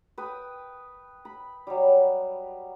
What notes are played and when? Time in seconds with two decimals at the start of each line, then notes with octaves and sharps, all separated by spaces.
0.18 B4 G5 D#6
1.25 B5
1.67 F#3 G3